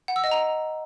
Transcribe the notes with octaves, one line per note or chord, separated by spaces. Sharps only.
F#5
E6
D#5
A#5